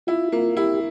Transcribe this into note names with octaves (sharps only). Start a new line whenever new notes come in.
E4 F4
A#3 F4
E4 G4